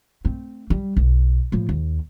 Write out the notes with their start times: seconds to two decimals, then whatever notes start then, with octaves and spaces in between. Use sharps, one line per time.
0.25 A3 C4
0.70 G3
0.97 B1
1.52 A2 F3
1.69 D#2